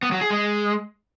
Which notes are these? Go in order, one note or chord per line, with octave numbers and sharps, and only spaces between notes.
B3
F#3
G#4
G#3